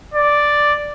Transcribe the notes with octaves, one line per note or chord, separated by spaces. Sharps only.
D5